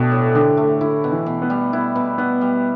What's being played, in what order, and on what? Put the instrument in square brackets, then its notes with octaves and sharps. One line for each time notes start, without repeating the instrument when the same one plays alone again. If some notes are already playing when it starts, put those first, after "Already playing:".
Already playing: [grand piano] B2 [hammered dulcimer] A3 D4 G4
[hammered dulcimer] A2
[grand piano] D3 [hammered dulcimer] G4
[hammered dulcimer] A3
[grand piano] D3 [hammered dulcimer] E4
[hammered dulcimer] B2
[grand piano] E3
[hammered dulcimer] B2
[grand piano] B3
[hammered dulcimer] G3
[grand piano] B3 [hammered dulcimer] E4
[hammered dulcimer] B2
[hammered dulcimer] B2 [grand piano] B3
[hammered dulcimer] G3